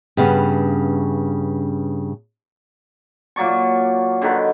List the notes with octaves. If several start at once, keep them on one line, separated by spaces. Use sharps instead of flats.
G2 C#3 B3 C#4
A#2 F#3 D5 C#6
D3 D#3 B4